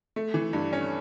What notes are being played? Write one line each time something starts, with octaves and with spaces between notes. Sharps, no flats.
A3
E3
G2
C#4